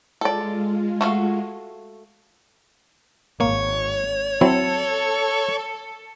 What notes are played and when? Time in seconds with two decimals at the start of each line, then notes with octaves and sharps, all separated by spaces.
0.21 G#3 F4 A4 D5
1.01 A3 F#4 F5
3.40 G#1 A#3 C#5
4.41 F#3 C4 E4 A4